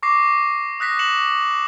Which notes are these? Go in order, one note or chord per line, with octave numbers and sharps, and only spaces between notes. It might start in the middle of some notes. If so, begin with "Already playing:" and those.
C#6 D6 A#6 C7
D#6 F#6 A#6 B6
C#7 E7 F#7